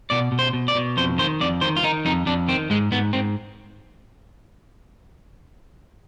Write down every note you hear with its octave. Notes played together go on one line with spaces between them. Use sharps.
B2 D5
B2
C5
B2
D5
B2
F2 C5
D#3 C5
F2 D5
D#3 C5
F4
D#3 D#4
F2 D#4
F2 D4
D#3 C4
G#2 G#3
G#2 B3
G#2 C4